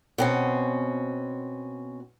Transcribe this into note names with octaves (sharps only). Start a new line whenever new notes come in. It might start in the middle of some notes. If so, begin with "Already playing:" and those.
B2 C4 C#4